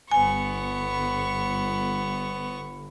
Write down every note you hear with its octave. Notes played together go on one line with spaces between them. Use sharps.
G1 B3 G#5 C#6